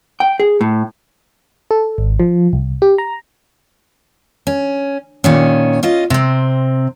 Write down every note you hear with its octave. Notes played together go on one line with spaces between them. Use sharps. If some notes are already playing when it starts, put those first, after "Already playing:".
G5
G#4
A2
A4
G#1
F3
C2
G4
A#5
C#4
A#2 D#3 C#4
C#4 F4 D#5
C3 C4